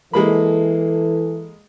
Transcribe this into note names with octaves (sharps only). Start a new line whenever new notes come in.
E3 G#3 A#3 A4 B5